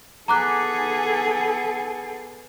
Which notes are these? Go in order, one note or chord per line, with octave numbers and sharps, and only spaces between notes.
B3 G#4 A4 G#5 A#5 D6 F#6